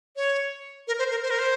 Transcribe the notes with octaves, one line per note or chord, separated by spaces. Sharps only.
C#5
A#4
C5
A#4
C5
A#4
C5